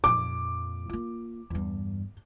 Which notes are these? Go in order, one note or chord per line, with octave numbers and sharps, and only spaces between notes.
F2 A#2 D6
A#3 F4
E2 G2